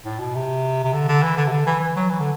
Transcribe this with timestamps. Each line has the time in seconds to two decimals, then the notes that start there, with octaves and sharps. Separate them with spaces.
0.05 A2
0.20 B2
0.35 C3
0.84 C3
0.93 D3
1.08 D3
1.23 E3
1.37 D3
1.47 C3
1.52 D3
1.66 E3
1.80 E3
1.96 F#3
2.10 E3
2.20 D3